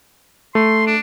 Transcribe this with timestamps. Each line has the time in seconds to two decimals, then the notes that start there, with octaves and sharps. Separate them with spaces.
0.55 A3 C6
0.87 D4